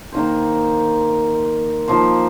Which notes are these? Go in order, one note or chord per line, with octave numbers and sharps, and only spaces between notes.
D#3 A#3 D#4 C5
F3 A#3 D#4 C5